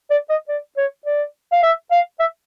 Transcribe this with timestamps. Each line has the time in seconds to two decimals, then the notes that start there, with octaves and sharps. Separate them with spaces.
0.11 D5
0.29 D#5
0.49 D5
0.77 C#5
1.06 D5
1.53 F5
1.63 E5
1.91 F5
2.20 E5